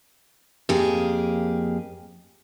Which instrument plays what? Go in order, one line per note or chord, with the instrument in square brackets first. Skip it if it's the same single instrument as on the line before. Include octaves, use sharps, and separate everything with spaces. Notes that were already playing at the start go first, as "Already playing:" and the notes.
[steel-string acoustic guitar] F2 A#3 G4 G#4